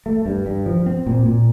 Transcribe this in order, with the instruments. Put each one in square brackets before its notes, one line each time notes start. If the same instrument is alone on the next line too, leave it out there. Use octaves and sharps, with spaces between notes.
[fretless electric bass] A3
G2
G2
F3
C4
A#2
A#2